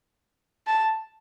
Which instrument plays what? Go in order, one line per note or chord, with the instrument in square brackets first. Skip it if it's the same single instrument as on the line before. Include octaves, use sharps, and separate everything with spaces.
[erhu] A5